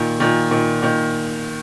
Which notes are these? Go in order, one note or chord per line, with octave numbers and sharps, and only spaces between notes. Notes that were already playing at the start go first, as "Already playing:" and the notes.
Already playing: A#2 D#3
A#2 D#3
A#2 D#3
A#2 D#3